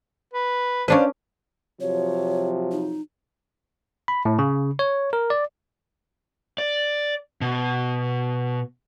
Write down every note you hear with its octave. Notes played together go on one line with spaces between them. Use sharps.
B4
C#4 D4 B4 C5 D5 F5
C3 F3 F#3 C#5
D#4
B5
A2
C#3
C#5
A#4
D5
D5
B2